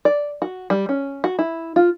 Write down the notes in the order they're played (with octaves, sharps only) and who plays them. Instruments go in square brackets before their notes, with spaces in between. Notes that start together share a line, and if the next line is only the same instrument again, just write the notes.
[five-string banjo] D5
F#4
G3
C#4
F#4
E4
F4